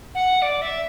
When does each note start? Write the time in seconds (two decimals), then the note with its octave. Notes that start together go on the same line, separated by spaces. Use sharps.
0.15 F#5
0.42 D5
0.62 E5